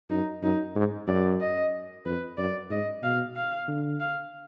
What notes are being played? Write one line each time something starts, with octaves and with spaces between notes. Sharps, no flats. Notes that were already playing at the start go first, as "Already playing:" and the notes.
F#2 D#4
F#2 D#4
G#2
F#2 D5
D#5
F2 B4
F#2 D5
G#2 D#5
B2 F5
F5
D3
F5